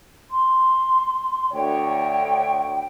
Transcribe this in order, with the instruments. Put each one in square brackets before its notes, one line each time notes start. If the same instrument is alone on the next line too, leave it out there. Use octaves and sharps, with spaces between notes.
[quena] C6
[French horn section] D2 C#5 [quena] G5